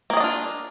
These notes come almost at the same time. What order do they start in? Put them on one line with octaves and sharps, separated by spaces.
A#3 G#4 D#5 D4 F4